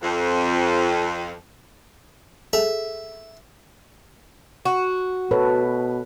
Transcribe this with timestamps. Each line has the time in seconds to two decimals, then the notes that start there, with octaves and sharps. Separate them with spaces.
0.02 F2
2.53 G#4 A4 E5
4.65 F#4
5.31 B2 A4 B4 C#5